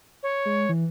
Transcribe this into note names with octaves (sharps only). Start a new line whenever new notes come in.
C#5
G#3
E3